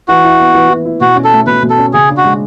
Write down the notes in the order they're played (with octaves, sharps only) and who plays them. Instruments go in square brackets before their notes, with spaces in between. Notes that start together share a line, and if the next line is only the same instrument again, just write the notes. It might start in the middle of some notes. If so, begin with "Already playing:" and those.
[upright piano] E3 [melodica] F#4
[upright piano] E4
B3
E3
E3
E4
[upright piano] B2 [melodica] F#4
[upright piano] C#4
[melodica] A4
[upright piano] A3
[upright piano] B2 [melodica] B4
[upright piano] B2
[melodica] A4
[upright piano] C#4
[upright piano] C#3 [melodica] G#4
[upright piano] D4
[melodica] F#4
[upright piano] G#3